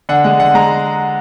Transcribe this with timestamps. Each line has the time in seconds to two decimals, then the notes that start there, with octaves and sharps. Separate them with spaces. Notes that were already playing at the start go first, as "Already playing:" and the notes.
0.09 D3 F#5
0.24 G#3 F#5
0.39 D3 F#5
0.54 G#3 A#5